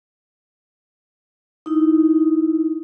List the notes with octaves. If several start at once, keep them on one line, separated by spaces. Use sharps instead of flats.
D#4 E4